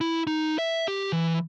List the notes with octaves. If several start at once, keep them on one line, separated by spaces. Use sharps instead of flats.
E4
D#4
E5
G4
E3